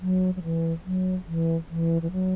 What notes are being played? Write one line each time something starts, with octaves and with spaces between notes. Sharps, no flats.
F#3
F#3
E3
F#3
E3
E3
E3
F#3